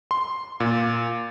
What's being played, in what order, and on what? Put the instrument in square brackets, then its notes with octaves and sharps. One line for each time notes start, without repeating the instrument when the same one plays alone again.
[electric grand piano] C6
A#2